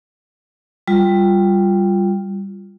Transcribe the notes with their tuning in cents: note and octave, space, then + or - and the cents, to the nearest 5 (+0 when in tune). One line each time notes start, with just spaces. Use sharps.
G3 +0 F4 +0